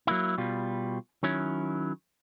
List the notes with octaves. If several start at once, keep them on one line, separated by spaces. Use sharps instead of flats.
F#3 A#3 E4
B2 G3 F4
D#3 F#3 C#4 E4